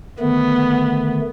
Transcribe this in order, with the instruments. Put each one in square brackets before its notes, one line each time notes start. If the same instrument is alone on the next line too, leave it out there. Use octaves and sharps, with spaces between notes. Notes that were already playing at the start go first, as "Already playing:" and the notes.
[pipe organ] D3 D#3 A3 [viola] B3